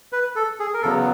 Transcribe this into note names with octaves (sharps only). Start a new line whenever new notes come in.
B4
A4
G#4
A#4
E2 C#3 F#3 B3 A4